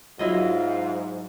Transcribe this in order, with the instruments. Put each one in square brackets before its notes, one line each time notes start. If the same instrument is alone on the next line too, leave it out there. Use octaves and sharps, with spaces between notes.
[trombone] G#2 [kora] F#3 E4 D#5 [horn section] F4